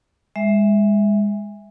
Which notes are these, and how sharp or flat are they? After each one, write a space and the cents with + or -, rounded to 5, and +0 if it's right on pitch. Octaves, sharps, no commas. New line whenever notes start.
G#3 -20 E5 +0